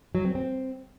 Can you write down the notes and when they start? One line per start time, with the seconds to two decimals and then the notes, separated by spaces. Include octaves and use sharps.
0.15 F#3
0.25 C4
0.35 C4